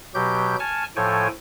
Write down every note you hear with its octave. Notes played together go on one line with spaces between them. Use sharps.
B2 F#3 G4 G6
G#5 A5 C#6 F6
A2 F3 A4 C#5 G5 G#5